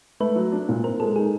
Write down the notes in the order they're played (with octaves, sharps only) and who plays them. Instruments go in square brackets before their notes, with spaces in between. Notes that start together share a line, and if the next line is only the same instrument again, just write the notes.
[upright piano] A3 [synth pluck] B4
[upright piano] F#3
D4
A#2
[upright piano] C4 [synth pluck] A#4
[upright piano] G#3 [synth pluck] A4
[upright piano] D#4 [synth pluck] G#4